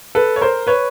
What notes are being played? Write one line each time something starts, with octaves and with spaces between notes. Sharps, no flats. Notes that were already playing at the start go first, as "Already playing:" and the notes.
A4 B4
C#5
A#4 C5
B4 C#5